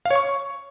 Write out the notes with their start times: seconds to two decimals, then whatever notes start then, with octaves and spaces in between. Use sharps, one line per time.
0.05 F5
0.11 C#5
0.16 C#6